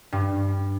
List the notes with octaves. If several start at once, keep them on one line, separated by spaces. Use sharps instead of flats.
G2